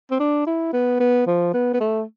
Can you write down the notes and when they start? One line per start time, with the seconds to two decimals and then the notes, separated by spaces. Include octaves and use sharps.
0.11 C4
0.20 D4
0.47 E4
0.73 B3
1.00 B3
1.27 F3
1.54 B3
1.74 B3
1.80 A3